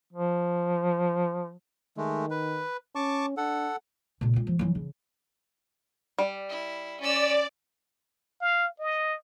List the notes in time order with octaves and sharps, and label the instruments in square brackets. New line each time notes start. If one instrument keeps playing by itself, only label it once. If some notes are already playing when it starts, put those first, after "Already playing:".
[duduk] F3
[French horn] D#3 [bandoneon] G#3 A3
[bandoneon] B4
[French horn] C#4 [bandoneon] A5 C#6 D6
[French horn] D4 [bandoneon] A4 F#5
[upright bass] A#2 C#3
G#3 F4
F3
E3 F#3
C#3
[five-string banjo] G3
[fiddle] E4
[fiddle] C#4 E6 [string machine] D5
[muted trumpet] F5
D#5